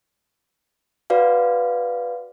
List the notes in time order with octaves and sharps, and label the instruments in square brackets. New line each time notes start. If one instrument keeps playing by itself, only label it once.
[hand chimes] F#4 B4 D5 F5